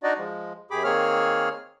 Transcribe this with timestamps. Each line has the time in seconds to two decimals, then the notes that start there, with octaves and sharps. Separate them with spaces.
0.03 D4 D#4 F#4 D5 D#5
0.18 F3 G#3
0.71 F#2 G4 G#4 B5 D6
0.84 D#3 A#3 C4 G#4 C#5 F6